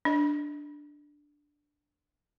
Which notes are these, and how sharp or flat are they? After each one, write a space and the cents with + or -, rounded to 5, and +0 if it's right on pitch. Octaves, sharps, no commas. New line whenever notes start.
D4 +0 D#5 +10